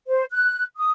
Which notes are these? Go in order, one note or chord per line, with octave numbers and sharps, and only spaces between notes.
C5
F#6
D#6